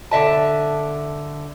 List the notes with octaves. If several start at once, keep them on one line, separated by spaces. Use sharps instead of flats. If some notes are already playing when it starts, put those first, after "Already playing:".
D3 E5 A5